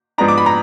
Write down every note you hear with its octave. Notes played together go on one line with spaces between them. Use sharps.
G#2 F3 B3 D4 A#5
D6
B5
A#5